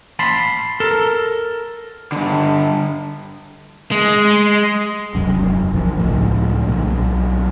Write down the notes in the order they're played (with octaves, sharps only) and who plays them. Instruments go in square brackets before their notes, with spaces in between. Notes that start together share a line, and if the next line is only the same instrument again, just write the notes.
[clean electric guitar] A5 B5 C6
A4 A#4
[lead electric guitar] G2 D3
[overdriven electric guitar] G#3
[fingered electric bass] E1 C2 F#2
A#1 E3 F3
C#2 A2 F3
B1 A#2